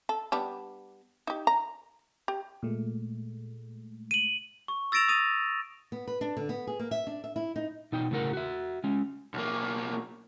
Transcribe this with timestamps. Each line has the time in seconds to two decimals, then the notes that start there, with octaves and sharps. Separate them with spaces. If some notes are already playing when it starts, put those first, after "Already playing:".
0.09 A4
0.32 G3 B3 D4
1.27 D#4 G4
1.47 A#5
2.28 G4
2.63 A#2 G#3 A3
4.11 D#7 F#7
4.68 C#6
4.92 E6 A6 A#6 D7 E7 F7
5.08 D#6 A6 D#7 F7
5.92 B3
6.07 B4
6.21 D4
6.37 D3
6.49 B3
6.67 G#4
6.79 A#3
6.91 E5
7.07 D4
7.24 E5
7.36 E4
7.56 D#4
7.92 B2 D#4 G5
8.11 A2 C#3 F#3 F#4 A#4 F#5
8.33 F#4 E5
8.84 G#3 C#4
9.34 B1 A#3